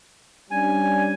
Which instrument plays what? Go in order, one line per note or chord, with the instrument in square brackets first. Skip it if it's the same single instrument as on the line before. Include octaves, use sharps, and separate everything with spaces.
[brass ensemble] G3 C#4 D4 [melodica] G#5